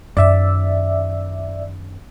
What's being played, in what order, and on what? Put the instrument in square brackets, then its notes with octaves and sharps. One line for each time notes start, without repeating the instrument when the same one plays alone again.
[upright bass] F#2 D#3 [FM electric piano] D5 E5